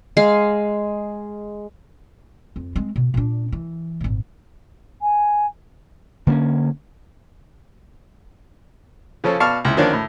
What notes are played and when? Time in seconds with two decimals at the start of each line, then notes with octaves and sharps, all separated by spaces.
0.17 G#3 F5
2.56 F2
2.76 G#3 C4
2.96 B2
3.14 A#2 D4
3.52 E3
4.01 G#1 A#2
5.01 G#5
6.27 D3 A#3 C4 C#4
9.24 C#3 F3 C#4 A4
9.40 B2 D5 F5 A5 C#6
9.65 C#2 E4
9.77 D3 D#3 F3 A#3 C#4 D4
9.93 A2